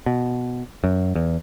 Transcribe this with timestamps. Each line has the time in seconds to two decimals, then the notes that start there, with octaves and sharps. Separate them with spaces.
0.06 B2
0.84 F#2
1.15 E2